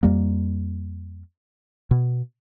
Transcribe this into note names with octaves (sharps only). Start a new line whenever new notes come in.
F2 G3 A#3
B2